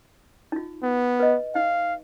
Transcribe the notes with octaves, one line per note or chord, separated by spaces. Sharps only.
D#4 F4
B3
B4 D#5
D#4 F5